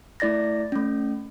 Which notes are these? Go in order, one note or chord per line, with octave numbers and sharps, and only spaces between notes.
A3 E4 D5 A6 A#6
A3 C#4